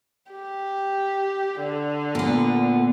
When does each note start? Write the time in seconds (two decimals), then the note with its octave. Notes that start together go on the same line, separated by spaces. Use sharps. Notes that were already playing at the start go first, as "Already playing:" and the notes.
0.32 G4
1.60 D3
2.15 A#2 B3